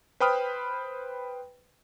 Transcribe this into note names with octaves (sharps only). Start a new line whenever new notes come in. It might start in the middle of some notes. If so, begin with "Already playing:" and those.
B4 C5 G5 B5 D#6 F6